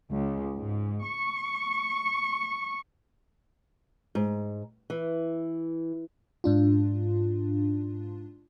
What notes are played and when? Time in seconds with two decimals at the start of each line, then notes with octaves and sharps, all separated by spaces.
0.11 C#2
0.57 G#2
1.09 C#6
4.15 G#2
4.90 E3
6.44 G#2 D4 F4